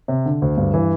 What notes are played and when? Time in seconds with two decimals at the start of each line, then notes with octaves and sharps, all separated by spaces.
0.08 C3
0.26 D3
0.42 D2
0.57 G2
0.74 E3